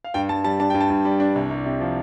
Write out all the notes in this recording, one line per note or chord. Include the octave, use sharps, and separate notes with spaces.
F5
G2 G5
G2 A5
G3 A5
D4 A5
G2 G5
A5
G2
G3
D4
C2
C2
C3
F3